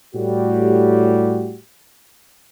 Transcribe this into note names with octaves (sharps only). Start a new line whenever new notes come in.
A2 G3 F#4 G4